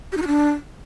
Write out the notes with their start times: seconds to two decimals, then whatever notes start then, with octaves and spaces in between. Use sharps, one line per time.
0.12 G4
0.17 D#4
0.22 F#4
0.27 D4